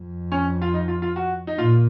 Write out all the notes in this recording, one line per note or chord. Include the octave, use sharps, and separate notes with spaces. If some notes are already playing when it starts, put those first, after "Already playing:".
Already playing: F2
C#4
F4
D#4
F4
F4
F#4
D#4
A#2 F4